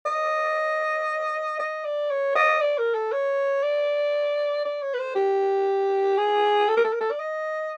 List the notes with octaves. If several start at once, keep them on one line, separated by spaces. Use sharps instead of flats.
D#5
D#5
D5
C#5
D#5
D5
A#4
A4
C#5
D5
D5
C#5
B4
C5
G4
G#4
A4
A#4
A4
A#4
A4
D5
D#5